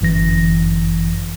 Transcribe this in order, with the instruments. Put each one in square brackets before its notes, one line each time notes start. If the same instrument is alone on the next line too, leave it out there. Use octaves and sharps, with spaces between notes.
[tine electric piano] G1 F#2 E3 A#6